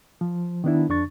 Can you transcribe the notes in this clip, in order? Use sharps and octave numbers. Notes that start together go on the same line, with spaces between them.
F3
D#3 B3 D4 E4
F2 D4 C#6 A6